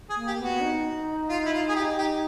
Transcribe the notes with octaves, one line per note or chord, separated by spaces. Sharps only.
G#4
A#3
G4
B3
F#4
D#4
F4
E4
F4
G#4
G4
G4